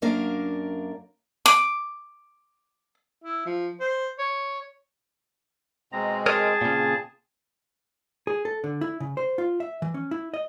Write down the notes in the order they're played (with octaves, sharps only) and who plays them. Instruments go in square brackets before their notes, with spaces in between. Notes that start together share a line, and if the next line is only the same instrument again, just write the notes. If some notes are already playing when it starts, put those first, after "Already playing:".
[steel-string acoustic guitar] F#2 A#3 D4 A#4 F5
[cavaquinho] D6
[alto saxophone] E4
F3
C5
C#5
[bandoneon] B2 G#3 C4 [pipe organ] A#5
[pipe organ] G#4 A5 [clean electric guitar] A#4 C#5 D#5
[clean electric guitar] A#2 C#3 [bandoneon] C4
[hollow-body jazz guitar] G#4
A4
D3
E4
C#3
C5
F4
E5
E3
C#4
E4
D#5